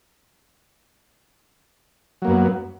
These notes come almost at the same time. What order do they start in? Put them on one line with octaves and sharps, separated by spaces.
F#3 A#3 F#2 B3